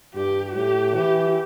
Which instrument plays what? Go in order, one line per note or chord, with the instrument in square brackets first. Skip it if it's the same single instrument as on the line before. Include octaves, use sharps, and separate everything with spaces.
[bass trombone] G2 [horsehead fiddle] G4
[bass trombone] A2 [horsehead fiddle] G4
[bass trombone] E3 [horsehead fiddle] G4